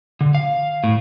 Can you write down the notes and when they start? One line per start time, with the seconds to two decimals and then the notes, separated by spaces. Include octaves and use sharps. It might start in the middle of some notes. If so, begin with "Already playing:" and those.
0.21 D3
0.35 F5
0.84 A2